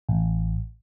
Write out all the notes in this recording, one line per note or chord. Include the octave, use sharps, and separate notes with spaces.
A1